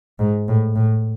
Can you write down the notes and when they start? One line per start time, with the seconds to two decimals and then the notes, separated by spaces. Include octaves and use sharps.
0.19 G#2
0.48 A2
0.75 A2